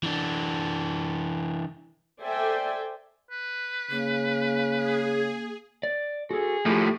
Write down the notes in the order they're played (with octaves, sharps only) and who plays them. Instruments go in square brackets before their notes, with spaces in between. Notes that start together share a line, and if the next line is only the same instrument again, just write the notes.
[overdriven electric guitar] E3 D4
[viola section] A4 C5 D5 E5 G5 G#5
[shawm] B4
[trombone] C#3 [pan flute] A#3
[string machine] G#4
[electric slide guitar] D5
[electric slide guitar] F#4 A4 [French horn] G#4
[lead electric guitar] A2 F3 [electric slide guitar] A3 G4